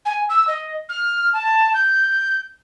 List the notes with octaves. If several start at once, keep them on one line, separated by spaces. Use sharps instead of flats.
G#5
E6
D#5
F6
A5
G6